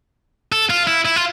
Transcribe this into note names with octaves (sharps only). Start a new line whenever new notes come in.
A4
F4
E4
E4
F4